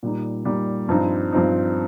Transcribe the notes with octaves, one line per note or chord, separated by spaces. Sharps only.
A#2 G3 D#4
A#2 G3 D#4
G2 F3 C4 D#4
G2 F3 C4 D#4